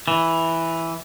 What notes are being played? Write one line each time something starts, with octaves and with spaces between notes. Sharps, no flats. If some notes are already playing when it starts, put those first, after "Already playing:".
E3